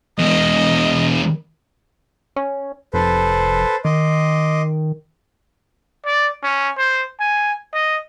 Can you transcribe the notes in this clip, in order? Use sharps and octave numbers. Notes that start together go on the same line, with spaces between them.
E2 G#3 D#5
C#4
F1 A4 B4 C5
D#3 D#5 C6 D6
D5
C#4
C5
G#5
D#5